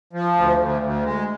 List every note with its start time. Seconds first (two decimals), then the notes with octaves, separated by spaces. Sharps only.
0.13 F3
0.35 D2
0.59 D2
0.82 D2
1.04 G#3